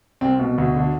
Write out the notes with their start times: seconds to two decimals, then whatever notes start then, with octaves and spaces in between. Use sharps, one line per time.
0.21 C2 C4
0.39 B2
0.58 D2
0.76 D3